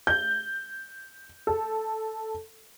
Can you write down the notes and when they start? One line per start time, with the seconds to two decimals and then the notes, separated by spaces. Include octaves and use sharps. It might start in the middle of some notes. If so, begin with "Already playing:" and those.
0.07 G6
1.47 A4